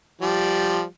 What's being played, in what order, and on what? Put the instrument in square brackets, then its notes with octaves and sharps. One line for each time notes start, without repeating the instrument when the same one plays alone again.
[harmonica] F3 G3